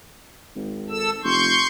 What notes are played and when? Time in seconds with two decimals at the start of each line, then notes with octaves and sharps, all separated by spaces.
0.56 G#1
0.90 A4 E6
1.23 F1 C6 C#6 G6